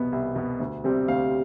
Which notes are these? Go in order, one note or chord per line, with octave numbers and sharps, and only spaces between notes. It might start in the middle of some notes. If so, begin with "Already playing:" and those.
Already playing: C2 B2 B3
C2
B2 B3
D2
C3 G3 C4
D2 F5